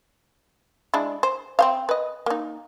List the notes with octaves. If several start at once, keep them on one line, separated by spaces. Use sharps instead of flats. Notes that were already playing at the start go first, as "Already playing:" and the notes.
G#3 D4 E4
C5
C4 C5 F5
B4 D#5
A#3 D#4